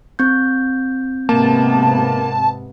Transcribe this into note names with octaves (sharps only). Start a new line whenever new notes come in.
C4 G6
G#2 C3 A#3 B3 A5